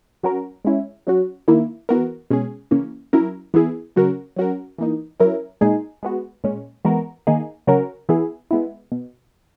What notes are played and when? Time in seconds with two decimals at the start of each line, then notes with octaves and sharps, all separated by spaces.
0.23 F#3 C#4 F#4 A#4
0.65 G#3 C#4 E4
1.07 F#3 C#4 F#4
1.48 D#3 A#3 E4
1.89 E3 B3 F#4 A#4
2.30 B2 G#3 C#4 G#4
2.71 C#3 E3 A#3 C#4
3.13 F#3 C#4 E4 A#4
3.54 E3 B3 E4 G#4
3.96 C#3 F#3 C#4 F#4 A#4
4.36 F#3 C#4 F#4 A#4
4.78 E3 A#3 D#4
5.20 F#3 C#4 E4 A#4
5.61 A#2 G#3 D#4 G#4
6.03 G#3 B3 F#4
6.44 A#2 G#3 C#4
6.85 E3 G#3 B3 F#4 A#4
7.27 D#3 A#3 D#4 G#4
7.67 C#3 F#3 C#4 F#4 A#4
8.09 E3 B3 E4 G#4
8.51 G#3 B3 E4
8.92 B2